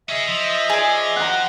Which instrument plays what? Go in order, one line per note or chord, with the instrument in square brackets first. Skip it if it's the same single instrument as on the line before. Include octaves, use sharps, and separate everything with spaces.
[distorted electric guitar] C#4 G#4 [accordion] D#5 E5
[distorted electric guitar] F3
[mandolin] G#4 D5
[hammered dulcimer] F#5 A#5 [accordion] G5